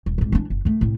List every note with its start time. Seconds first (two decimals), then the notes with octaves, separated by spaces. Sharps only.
0.06 D#1
0.18 G#2 C3
0.32 E3 D4
0.50 F#1
0.65 D#3 A3
0.81 A2 C3